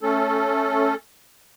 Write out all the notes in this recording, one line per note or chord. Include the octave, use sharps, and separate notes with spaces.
A3 C#4 A4